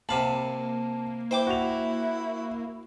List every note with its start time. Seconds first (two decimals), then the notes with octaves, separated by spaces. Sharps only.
0.09 C3 A#3 F5 A5 B5
1.31 E4 C5 G5 D6
1.47 F#4 F7